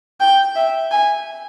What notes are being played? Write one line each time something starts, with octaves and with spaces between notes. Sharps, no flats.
G5
E5
G#5